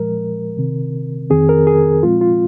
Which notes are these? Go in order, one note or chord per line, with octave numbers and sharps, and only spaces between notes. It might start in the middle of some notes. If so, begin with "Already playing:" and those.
Already playing: A#2 F3 G#3 A#4
C3 D#3 C4
F2 D#3 C4 G#4
A#4
G#4
A#2 F3 G#3 C4 F4
F4